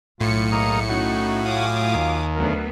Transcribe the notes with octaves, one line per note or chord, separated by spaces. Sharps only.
B1 A2 F4 C#7
G#3 A#3 A#4 D#6
C#4 D#4 F#4
F#3 F4 F5 G#5 D6 D#6
D#2
D2 F#3 B3 A#4